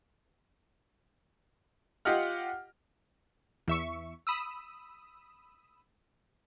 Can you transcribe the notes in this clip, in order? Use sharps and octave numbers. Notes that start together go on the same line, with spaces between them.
F4 G4 D#5 F#5 F6
E2 E5 C#6
B5 D#6 E6